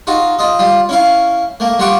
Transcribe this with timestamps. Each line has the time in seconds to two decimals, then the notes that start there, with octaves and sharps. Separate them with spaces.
0.07 D#4 F4 F#4
0.39 F4 D#5
0.59 G3 F4
0.89 C#4 E4 F5
1.60 A3 A#3
1.79 G3 F4 F#5 C#6 D6